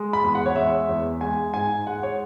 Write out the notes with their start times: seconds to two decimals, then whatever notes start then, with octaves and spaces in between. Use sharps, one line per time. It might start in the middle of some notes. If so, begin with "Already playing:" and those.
Already playing: G#3
0.13 B5
0.24 E2
0.35 F#5
0.46 C#5
0.56 G#3 E5
0.89 E2
1.21 G#3 G#5
1.54 G#2 G#5
1.87 G#3 F#5
2.03 C#5